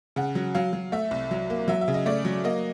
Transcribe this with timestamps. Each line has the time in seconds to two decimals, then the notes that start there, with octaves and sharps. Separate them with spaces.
0.16 C#3 F#5
0.35 F#3
0.55 F#3 F5
0.73 F#3
0.92 A3 E5
1.11 C2
1.31 F#3
1.50 A#3
1.68 F#3 E5
1.81 E5
1.88 C#3
1.94 D#5
2.06 A3 D5
2.25 F#3
2.44 A#3 D#5